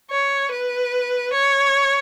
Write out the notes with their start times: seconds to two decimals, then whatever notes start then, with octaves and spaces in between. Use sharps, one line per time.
0.11 C#5
0.51 B4
1.33 C#5